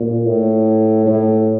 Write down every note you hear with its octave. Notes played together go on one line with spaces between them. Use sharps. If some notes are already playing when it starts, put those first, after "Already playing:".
Already playing: A#2
A2
A2